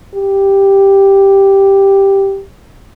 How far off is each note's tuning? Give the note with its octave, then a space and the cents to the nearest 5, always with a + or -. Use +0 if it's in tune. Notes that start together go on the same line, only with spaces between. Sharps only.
G4 +0